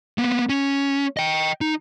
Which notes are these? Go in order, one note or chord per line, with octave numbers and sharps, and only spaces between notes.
A#3 B3
C#4
D#5 G5
D#4